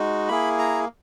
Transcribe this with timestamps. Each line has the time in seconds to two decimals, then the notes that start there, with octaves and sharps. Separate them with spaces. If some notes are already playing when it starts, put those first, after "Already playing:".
Already playing: G#3 D#4 F#4
0.28 A#3 E4 G#4 B5
0.59 A#5